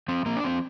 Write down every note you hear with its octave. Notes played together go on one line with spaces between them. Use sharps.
F3 C4
F3 A#3
D4
F3 C4